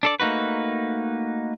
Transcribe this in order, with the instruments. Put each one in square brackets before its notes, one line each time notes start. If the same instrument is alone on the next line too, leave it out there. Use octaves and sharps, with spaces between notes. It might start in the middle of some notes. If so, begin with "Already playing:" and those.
[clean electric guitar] D4 A4 D5
A3 A#3 D#4 F#4 B4